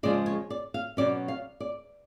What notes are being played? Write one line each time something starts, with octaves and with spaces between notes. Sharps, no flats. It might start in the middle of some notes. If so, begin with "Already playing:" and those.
C#3 F3 G#3 D5
C#5
D5
F5
B2 F#3 C#4 D5
F5
D5